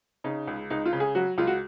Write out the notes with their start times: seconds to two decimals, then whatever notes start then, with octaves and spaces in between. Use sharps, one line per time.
0.24 C#3 D#4
0.47 C#2
0.70 C#2 D#4
0.86 F4
0.93 C#3
1.00 G#4
1.15 F#3 F#4
1.38 C#2 F4
1.47 F#4